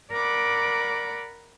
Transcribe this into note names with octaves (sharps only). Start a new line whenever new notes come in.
A#4 D5 F#5 B5 D6